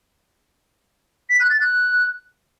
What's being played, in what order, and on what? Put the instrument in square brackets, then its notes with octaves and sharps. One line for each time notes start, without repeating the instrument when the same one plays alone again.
[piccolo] B6
F#6
A6
F#6